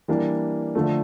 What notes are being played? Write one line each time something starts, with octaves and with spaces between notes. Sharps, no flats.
E3 G3 A#3 D4
D3 F3 A3